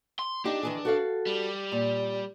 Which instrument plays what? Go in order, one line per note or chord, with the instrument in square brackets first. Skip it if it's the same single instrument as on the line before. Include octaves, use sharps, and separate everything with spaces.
[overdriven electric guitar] C6
[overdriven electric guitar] D4 [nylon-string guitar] D#4 G4
[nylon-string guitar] D#3 E3 G#4
F#4 A4 F5
[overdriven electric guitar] G3
[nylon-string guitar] A#2